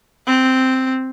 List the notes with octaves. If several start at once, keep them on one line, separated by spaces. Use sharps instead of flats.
C4